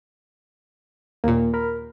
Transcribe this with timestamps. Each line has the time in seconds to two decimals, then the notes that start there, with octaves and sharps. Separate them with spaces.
1.24 D#2 A#2 A#3
1.54 A#4 B5 F6